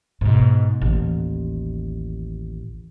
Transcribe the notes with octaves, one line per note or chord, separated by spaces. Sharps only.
G#2 B2
A1 D#2